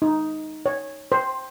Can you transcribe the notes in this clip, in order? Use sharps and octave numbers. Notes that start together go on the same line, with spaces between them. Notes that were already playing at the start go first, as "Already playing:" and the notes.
D#4
C#5
C5